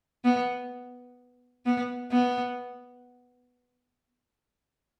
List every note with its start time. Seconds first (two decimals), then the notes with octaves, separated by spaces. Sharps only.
0.25 B3
1.66 B3
2.12 B3